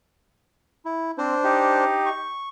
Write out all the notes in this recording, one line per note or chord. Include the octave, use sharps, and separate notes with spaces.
E4
C4 D4 C5
D#4 G4
C#6